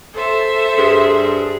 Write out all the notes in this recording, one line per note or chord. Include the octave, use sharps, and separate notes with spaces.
A4 C5 E5
G2 G#4